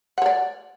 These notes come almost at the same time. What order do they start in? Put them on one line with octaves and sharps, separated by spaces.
F#5 C#5 D5